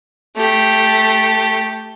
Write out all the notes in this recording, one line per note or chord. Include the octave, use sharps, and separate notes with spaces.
A3 G4